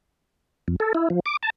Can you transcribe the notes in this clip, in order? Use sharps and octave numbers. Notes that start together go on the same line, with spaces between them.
F2
A4
E4
F3
D6
A5